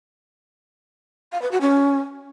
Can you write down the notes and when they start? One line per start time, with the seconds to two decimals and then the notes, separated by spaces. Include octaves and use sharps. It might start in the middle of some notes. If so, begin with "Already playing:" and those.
1.32 F5
1.42 B4
1.51 F#4
1.61 C#4